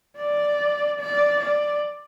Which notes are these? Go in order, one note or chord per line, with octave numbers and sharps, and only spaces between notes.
D5
D5
D5